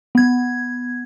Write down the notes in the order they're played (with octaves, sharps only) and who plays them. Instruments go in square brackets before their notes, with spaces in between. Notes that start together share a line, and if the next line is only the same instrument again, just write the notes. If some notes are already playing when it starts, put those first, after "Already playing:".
[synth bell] B3 G#6